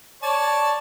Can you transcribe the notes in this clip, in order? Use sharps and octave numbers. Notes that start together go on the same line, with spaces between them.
C#5 D5 A5